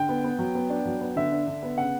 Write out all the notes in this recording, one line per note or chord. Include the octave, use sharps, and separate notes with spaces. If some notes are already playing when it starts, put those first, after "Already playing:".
Already playing: D3 G5
B3
B3
F#3
B3
D4
F#3
B3
D3 E5
D4
D3
B3
C#3 F#5